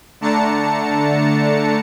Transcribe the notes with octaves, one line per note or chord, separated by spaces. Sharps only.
D3 A3 D4 A5 A#5 C#7